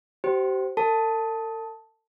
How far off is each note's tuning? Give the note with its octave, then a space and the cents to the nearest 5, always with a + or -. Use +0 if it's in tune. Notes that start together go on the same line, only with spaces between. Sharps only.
G4 -35 C5 -5
A4 +45 A5 +0